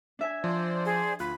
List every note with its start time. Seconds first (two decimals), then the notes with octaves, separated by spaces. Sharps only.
0.19 D4 E5 G#5
0.44 F3 C5 D5
0.85 G#4
1.20 D2 F4 B5 F#6